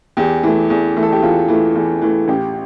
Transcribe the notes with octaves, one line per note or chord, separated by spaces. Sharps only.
E2 G4
E3 A3
E2
E3 A3
A4
G4
E2 F4
E3 A3
E2
E3 A3
A1 G4